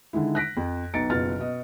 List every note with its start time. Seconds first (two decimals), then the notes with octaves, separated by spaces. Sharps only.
0.13 D3 D#3 G#3 E4
0.35 F#6 A#6 B6 D7
0.57 F2
0.94 B1 B2 A#5 A6 C#7 D7
1.10 F#1 B2 F4 F6 A6
1.39 B2 D#5